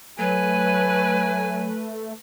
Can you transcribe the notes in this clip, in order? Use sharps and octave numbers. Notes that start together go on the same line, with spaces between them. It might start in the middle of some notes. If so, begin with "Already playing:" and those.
F#3 A3 B4 G#5